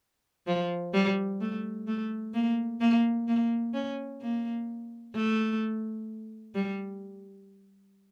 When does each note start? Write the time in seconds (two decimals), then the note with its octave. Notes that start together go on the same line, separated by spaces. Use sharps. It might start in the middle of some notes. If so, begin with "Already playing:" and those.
0.47 F3
0.93 G3
1.41 A3
1.87 A3
2.34 A#3
2.81 A#3
3.28 A#3
3.74 C#4
4.21 A#3
5.14 A3
6.55 G3